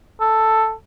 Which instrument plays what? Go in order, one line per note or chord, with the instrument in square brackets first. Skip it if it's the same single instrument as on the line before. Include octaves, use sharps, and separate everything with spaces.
[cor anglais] A4